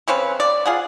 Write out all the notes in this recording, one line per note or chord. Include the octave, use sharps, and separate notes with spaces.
C#3 C4 C#4 B4
D5
F4 G#4 F#5